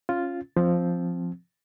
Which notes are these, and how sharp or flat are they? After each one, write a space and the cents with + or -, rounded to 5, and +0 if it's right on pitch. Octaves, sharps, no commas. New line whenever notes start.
C#4 -10 F4 +0
F3 +0 C4 +0